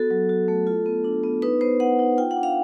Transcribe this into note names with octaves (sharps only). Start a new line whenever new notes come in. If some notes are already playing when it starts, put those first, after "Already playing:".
Already playing: B3 F#4 A4
F#3
F#4
A3
F4
B3
D4
B3
D#4 B4
B3 C5
B3 F#5
D#4
F4 G5
F#5
D4
F5